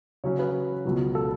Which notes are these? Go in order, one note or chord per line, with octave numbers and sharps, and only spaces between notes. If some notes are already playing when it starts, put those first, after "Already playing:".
C#3 F#3 C#4 C#5
B4
C#2 B2 F#3
A4